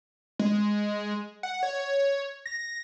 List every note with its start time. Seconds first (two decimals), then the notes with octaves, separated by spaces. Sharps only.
0.39 G#3
1.43 F#5
1.63 C#5
2.46 A#6